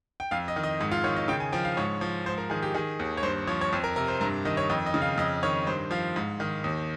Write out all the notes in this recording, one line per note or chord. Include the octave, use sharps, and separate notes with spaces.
G5
F2 F5
D#5
D#3
D#5
G#2
F4
D#3 C#5
D#5
C#3 G5
G#5
F3 G5
F5
G#2 C#5
F3
G#2 C5
A#4
D#3 G#4
G4
D#3 G#4
D#2
C#5
G2 C5
F3 C#5
C#5
F2 C5
A#4
C3 A#4
C5
G2 A#4
D#3 D#5
C#5
F2 D#5
D#5
C#3
F5
F2 D#5
D#3 C#5
G2 C5
F3 F5
G#2
D#3
D#2